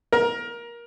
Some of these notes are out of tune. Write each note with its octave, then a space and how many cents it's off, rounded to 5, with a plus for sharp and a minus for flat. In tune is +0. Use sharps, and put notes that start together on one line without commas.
A#4 +20